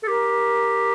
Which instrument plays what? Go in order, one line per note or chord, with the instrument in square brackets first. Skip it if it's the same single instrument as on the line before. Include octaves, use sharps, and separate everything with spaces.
[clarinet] A4
[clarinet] G4 [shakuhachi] A#4